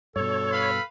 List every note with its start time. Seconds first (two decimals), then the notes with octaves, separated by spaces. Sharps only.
0.16 G2 B2 A4 C#5
0.52 B4 F5 B5